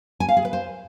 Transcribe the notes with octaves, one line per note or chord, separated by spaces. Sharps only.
G#5
F5
G#4
B4
C5